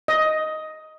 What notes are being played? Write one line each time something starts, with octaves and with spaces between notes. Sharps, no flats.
D#5